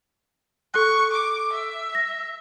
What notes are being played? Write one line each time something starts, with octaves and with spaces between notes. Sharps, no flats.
A4 C#6 F#6
D6
E5
A#6